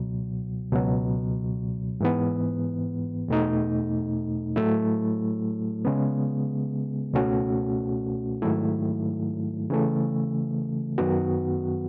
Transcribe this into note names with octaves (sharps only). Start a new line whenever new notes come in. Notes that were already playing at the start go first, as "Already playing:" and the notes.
Already playing: C#2 B2 F#3
C#2 B2 F#3
G#2 E3 B3
E2 B2 A3 D#4
A2 F#3 A3 E4
C#3 G#3 B3
C#2 B2 A3 C#4 F#4
G#2 D#3 F#3 A3 E4
C#3 E3 A3
F#2 D#3 F#3 B3 F#4